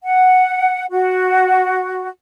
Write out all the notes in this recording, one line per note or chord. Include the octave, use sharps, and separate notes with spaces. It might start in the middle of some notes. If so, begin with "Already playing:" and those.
F#5
F#4